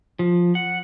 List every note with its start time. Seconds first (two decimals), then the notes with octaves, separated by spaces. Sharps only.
0.19 F3
0.55 F#5